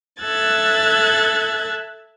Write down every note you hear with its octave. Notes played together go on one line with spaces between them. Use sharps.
A4 E5 E6 F#6 G#6 A6